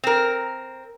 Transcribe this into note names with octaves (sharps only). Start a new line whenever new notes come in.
C4 A#4